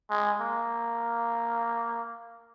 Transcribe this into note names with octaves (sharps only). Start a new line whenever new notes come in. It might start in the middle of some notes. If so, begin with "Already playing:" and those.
G#3
A#3